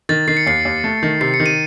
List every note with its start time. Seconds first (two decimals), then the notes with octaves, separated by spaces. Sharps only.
0.09 D#3 A6
0.28 D#3 C7
0.37 C#7
0.46 D#2 C7
0.65 D#2
0.84 A3
1.03 D#3
1.21 C3 C7
1.34 C#7
1.40 D#3
1.46 D#7